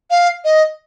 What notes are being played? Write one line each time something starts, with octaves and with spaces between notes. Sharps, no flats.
F5
D#5